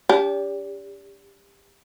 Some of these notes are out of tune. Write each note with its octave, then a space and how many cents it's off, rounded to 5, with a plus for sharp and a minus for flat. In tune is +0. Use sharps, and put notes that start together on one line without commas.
D4 -35 G4 +25